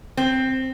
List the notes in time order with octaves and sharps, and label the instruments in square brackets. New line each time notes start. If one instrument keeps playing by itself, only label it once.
[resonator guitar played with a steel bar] C4